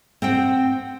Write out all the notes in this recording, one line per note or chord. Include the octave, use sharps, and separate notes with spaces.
C4 F#5 G5